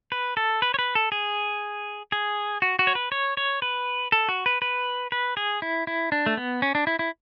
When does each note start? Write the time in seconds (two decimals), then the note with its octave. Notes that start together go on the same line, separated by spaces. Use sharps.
0.12 B4
0.37 A4
0.62 B4
0.74 C#5
0.79 B4
0.95 A4
1.12 G#4
2.12 G#4
2.62 F#4
2.79 F#4
2.87 C#5
2.95 B4
3.12 C#5
3.37 C#5
3.62 B4
4.12 A4
4.29 F#4
4.46 B4
4.62 B4
5.12 B4
5.37 G#4
5.62 E4
5.87 E4
6.12 D4
6.26 A3
6.37 B3
6.62 C#4
6.75 D4
6.87 E4
6.99 E4